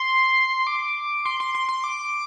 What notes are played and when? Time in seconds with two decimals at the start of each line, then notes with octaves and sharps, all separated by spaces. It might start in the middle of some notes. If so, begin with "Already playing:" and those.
Already playing: C6
0.67 D6
1.25 C6
1.40 C6
1.55 C6
1.69 C6
1.84 D6